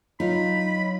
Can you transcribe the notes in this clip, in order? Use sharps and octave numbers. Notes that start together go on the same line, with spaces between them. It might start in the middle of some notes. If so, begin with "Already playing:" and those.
F#3 D#4 F4 B5